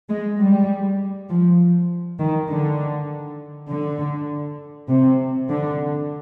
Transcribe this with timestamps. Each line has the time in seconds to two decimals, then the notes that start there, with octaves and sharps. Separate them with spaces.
0.09 G#3
0.39 G3
1.29 F3
2.19 D#3
2.50 D3
3.69 D3
4.88 C3
5.49 D3